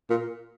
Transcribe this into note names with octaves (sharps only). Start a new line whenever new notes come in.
A#2